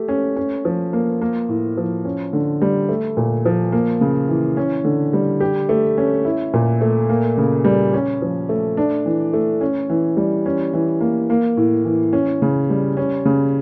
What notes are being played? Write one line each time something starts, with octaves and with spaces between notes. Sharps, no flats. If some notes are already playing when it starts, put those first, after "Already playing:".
Already playing: A3 G4
C#4
C#4
F3
A#3
A#3
A2
F3
C#4
D3
G3
A3
A#2
F3
A#3
C#3
E3
C#4
D3
G3
G4
A3
C#4
E4
A#2
A3
A#3
C#3
G3
C#4
F3
A3
D4
E3
A3
C#4
E3
G3
C#4
E3
A#3
A#3
A2
E3
C#4
C#3
G3
C#4
C#3